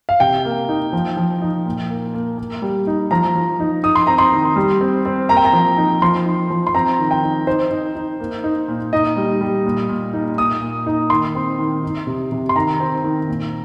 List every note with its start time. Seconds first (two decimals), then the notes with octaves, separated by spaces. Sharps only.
0.09 F5
0.20 C3 G5
0.45 A#3
0.69 D#4
0.93 F3
1.17 F3
1.41 D#4
1.66 A#2
1.89 A#3
2.14 A#3
2.38 A#3
2.62 G3
2.87 D#4
3.11 F3 A#5
3.35 F3
3.60 D#4
3.83 D#4 D#6
3.95 C6
4.07 C4 A#5
4.18 C6
4.32 D#3
4.56 G3
4.81 C4
5.05 C4
5.29 A#3 A#5
5.37 G5
5.45 A#5
5.53 F3
5.77 D#4
6.02 F3 C6
6.25 D#4
6.50 F3
6.67 C6
6.74 C4 A#5
6.99 D#3
7.11 G5
7.23 D#4
7.47 D#4 C5
7.71 D#4
7.96 D#4
8.20 A#3
8.44 D#4
8.68 A#2
8.93 D#4 D#5
9.16 G3
9.41 G3
9.65 A#2
9.89 A#2
10.13 D#4
10.37 A#2 D#6
10.61 A#2
10.86 D#4
11.10 D#3 C6
11.35 C4
11.59 D#3
11.83 D#4
12.07 C3
12.32 C3
12.49 C6
12.56 D#3 A#5
12.80 C4
13.04 D#3
13.28 A#2